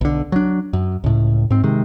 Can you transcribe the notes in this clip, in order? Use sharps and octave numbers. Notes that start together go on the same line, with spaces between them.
B1 D3
F#3 D4
F#2
C#2 A2
G#2 C4
C3 D#3 G#3